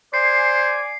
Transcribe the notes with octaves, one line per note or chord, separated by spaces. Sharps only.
C5 D5 G#5 C7